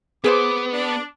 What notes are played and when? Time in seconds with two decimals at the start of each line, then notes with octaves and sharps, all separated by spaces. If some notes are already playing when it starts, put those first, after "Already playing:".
0.24 B3 G#4 B4 C5 D6
0.73 D4